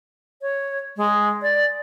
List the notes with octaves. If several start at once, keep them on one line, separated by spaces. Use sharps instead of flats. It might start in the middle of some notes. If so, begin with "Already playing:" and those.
C#5
G#3
D5